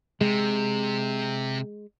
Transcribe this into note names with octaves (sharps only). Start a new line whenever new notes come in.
C3 G#3